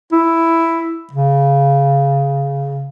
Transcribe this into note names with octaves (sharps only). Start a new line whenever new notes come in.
E4
C#3